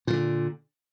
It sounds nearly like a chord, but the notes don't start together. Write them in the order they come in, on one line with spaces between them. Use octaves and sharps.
A#2 D#3 D3